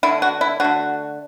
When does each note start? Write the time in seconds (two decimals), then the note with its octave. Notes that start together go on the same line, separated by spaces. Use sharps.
0.03 D3 A3 E4
0.22 F#4
0.41 E4
0.60 D3 A3 F#4